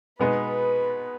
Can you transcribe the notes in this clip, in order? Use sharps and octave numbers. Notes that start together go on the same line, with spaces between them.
B2 G#3 B3 D#4 B4